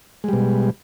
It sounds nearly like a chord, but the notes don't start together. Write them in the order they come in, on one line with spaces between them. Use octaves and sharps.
G#3 G3 B2